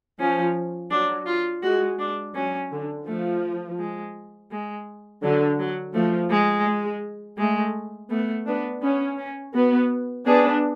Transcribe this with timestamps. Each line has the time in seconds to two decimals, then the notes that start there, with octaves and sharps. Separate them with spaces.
0.20 F3 C#4
0.91 F#3 D4
1.26 F4
1.62 G#3 F#4
1.99 D4
2.35 F#3 C#4
2.71 D3
3.06 F3 A3
3.79 G#3
4.51 G#3
5.22 D3 F#3
5.59 F#3
5.94 F3 A3
6.30 G#3
6.67 G#3
7.38 G#3 A3
8.10 A3 B3
8.46 B3 D4
8.82 B3 C#4
9.18 C#4
9.54 B3 F#4
10.26 B3 D4 G#4